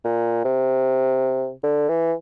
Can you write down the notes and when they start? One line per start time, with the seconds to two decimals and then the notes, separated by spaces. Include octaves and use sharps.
0.04 A#2
0.44 C3
1.63 D3
1.89 E3